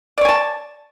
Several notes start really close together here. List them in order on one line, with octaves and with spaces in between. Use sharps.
D5 C#5 G#5 A5